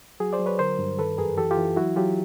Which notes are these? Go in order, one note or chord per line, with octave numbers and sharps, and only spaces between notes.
F#3 F#4 G#4
C5 D5
F#3
B4 C#5
D3 A#4 C5
G2
D#3 A4 B4
F#2 G#4 A#4
E3 G4 A4
F4 G4
E3
F#3 E4 F#4
F#3 F4 G4